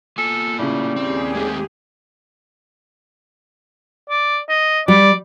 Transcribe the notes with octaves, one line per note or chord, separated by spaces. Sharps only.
A#3 F4 A4 G#5
A2 C#3 G3
D#2 C4 G4 G#4
G#3 A3 C4
D5
D#5
G3 D5